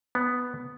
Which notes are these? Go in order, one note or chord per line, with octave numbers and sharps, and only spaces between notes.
B3